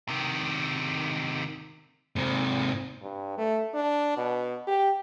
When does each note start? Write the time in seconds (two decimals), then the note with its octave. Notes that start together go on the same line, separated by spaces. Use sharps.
0.09 C3 D#3
2.16 G#2 C3
3.02 G2
3.38 A3
3.74 D4
4.17 B2
4.67 G4